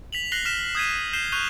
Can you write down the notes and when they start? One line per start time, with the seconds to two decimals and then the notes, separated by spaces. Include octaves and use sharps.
0.13 B6 F7 F#7
0.32 F#6 A#6 C7 F#7 G7
0.45 F6 B6 E7
0.75 D#6 G6 G#6 B6 D#7
1.13 G6 C7 E7 G7
1.32 C#6 F#6 G6 D#7 F7 G7